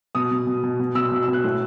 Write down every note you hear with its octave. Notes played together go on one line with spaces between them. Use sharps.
B2 D#6
B2
B2
B2
B2
B2 E6
B2 E6
E6
B2
F#6
A2